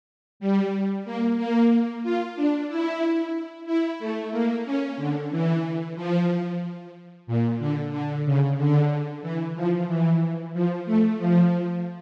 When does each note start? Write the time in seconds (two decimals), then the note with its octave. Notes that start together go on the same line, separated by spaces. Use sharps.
0.40 G3
1.05 A#3
1.38 A#3
2.03 F4
2.36 D4
2.68 E4
3.66 E4
4.00 A3
4.32 A#3
4.65 C#4
4.97 D3
5.31 E3
5.96 F3
7.27 A#2
7.59 D3
7.92 D3
8.25 C#3
8.58 D3
9.22 E3
9.56 F3
9.88 E3
10.54 F3
10.86 A3
11.19 F3